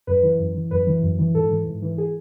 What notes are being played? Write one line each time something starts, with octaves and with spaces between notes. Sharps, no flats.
F#2 B4
E3
F#2
E3
F#2 B4
E3
F#2
E3
G#2 A4
E3
G#2
E3
G#4